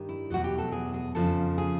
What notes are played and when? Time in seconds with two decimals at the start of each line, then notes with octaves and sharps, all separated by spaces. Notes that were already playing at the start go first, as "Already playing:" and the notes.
Already playing: G2 D#3 G3
0.09 E4
0.30 E2 B2 F#3 F#4
0.44 G4
0.58 A4
0.72 G#4
0.94 G#4
1.15 F2 C#3 F3 A4
1.58 G#4